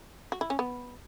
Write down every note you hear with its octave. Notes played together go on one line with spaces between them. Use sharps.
F#4
E4
C#4
B3